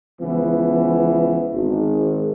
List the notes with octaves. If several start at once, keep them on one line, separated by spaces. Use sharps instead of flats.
C#2 E3 F3 B3
G#1